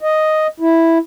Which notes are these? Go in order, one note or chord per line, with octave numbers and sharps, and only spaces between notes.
D#5
E4